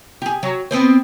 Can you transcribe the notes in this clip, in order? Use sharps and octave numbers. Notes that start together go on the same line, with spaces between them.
G4 G#4
F#3
B3 C4 C5